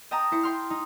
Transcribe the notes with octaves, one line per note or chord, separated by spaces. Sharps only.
D#5 G5 A5 A#5 D#6
E4 C5 C#7
G5 C6 F6
D#4